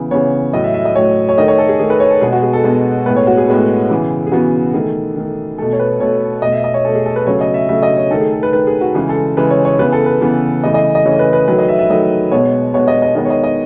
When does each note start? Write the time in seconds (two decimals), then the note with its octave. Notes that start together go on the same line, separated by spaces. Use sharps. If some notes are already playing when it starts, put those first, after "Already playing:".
Already playing: C#3 E3 B3
0.11 C#3 E3 B3 C#5
0.53 A2 F#3 A3 D#5
0.64 E5
0.74 E5
0.85 D#5
0.95 A2 F#3 A3 C#5
1.29 C#5
1.37 D#3 A3 D#5
1.48 C#5
1.58 A4
1.69 G#4
1.79 D#3 A3 G#4
1.90 B4
2.00 C#5
2.11 A4
2.21 B2 G#3 B3 G#4
2.32 F#4
2.43 G#4
2.53 A4
2.64 B2 G#3 B3
3.06 A2 G#3 B3 B4
3.16 C#5
3.27 F#4
3.37 G#4
3.48 A2 G#3 B3
3.90 C#3 E3 B3
4.27 G#4
4.32 C#3 E3 B3 F#4
4.74 D#3 A3 G#4
5.16 D#3 A3
5.58 B2 A3 A4
5.73 C#5
5.79 B4
6.00 B2 A3 C#5
6.42 B2 A3 D#5
6.52 E5
6.64 D#5
6.74 C#5
6.85 B2 A3 A4
6.95 G#4
7.06 A4
7.16 B4
7.27 C#3 F#3 A3 C#5
7.41 D#5
7.54 E5
7.69 C#3 F#3 A3 E5
7.83 D#5
7.97 C#5
8.11 D#3 A3 A4
8.21 G#4
8.32 A4
8.43 B4
8.53 D#3 A3 B4
8.67 G#4
8.81 F#4
8.95 C#3 E3 G#3 G#4
9.09 A4
9.37 C#3 E3 G#3 B4
9.50 C#5
9.65 C#5
9.79 C#3 E3 B3 B4
9.92 A4
10.06 B4
10.21 C#3 E3 B3
10.64 C#3 E3 A3 D#5
10.74 D#5
10.95 D#5
11.05 C#3 E3 A3 C#5
11.19 B4
11.33 B4
11.48 D#3 F#3 A3 B4
11.59 D#5
11.68 E5
11.79 E5
11.89 D#3 F#3 A3 D#5
12.31 B2 G#3 B3 C#5
12.74 B2 G#3 B3 C#5
12.88 D#5
13.02 D#5
13.15 D#3 G#3 B3 D#5
13.25 C#5
13.30 D#5
13.44 D#5